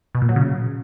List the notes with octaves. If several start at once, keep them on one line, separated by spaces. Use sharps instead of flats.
B2
A#2
F#3
C#3